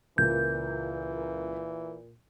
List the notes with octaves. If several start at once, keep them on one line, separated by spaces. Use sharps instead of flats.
C#2 A#2 E3 G6